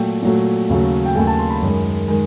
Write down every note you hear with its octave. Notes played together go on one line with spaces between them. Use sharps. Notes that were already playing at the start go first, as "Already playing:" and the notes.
Already playing: A#2 F#3 A3 G5
A#2 F#3 A3
D#2 C#3 F#3 A3
G5
D#2 C#3 F#3 A3 G#5
A5
C6
B5
F#2 D#3 G#3
D#3 G#3